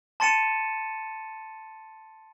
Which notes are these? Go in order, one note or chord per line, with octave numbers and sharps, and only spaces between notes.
A5 C6 A6 C#7 D#7 E7